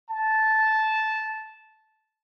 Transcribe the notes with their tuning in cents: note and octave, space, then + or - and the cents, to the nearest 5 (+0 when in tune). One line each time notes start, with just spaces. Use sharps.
A5 -10